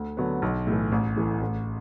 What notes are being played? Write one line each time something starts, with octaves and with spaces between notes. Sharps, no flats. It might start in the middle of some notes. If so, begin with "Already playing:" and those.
Already playing: D2
D3 F#3 B3
B1
A2 E3
A1
A2 E3
A1